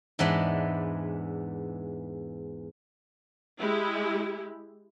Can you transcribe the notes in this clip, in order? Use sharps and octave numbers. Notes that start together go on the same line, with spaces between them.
E2 G#2 E3 G#3 B3 D4
G#3 E4 G4